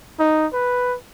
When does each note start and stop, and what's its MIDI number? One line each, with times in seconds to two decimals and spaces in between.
0.20 0.47 63
0.53 0.96 71